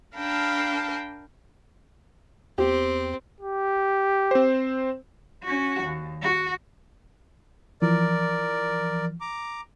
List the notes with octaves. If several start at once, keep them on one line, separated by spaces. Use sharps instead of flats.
D4 A#4 F5 G5 A5 B5
E2 C4 G4
G4
C4 C5
C#4 F#4
D#2
F#4
E3 F3 A#4 D5
A#5 D6